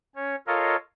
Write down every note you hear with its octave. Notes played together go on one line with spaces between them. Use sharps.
C#4 C#5
F4 A4 A#4 C#5 D#5 F5